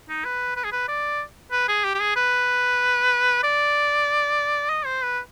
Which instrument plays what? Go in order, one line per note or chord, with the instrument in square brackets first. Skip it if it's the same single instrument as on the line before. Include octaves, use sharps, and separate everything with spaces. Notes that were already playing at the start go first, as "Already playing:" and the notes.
[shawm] D#4
B4
B4
G#4
B4
D5
B4
G#4
G4
G4
G#4
B4
D5
D#5
C5
B4